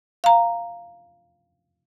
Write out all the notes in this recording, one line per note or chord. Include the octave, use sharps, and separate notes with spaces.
F5 A#5